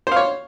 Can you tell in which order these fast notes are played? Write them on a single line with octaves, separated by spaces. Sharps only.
C5 F5 C#5